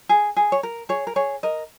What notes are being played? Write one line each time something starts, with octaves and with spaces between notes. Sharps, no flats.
G#4
G#4
C#5
A#4
G#4 C#5
A#4
G#4 C#5
A#4 D#5